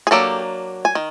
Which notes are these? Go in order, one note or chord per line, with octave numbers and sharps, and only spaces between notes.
G#4
F#3 A#3 D4 G4 A4
G#5
D#3